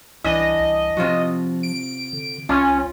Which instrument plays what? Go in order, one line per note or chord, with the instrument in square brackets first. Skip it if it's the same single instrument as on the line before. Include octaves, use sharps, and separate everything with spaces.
[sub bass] C2 [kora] E3 D4 [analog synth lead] D#5
[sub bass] C2
[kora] C3 F4 F#4 [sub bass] F3
[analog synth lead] D7
[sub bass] D3
[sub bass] C2 [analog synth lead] C#4 [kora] F4